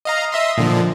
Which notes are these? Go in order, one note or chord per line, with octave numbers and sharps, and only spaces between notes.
D#5 F5 A#5
D#5 E5 C6
A#2 D3 F3